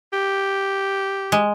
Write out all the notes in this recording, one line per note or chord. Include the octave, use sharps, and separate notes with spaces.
G4
G#3